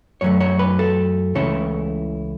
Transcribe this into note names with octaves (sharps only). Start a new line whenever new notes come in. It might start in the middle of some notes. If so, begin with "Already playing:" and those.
F#2 F#3 A3 C#5
C#5
B4
A4
C#2 C#3 E3 A3 E4 C#5